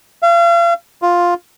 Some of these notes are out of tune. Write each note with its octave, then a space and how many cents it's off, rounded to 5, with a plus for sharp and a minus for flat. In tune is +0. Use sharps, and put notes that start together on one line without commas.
F5 -40
F4 +5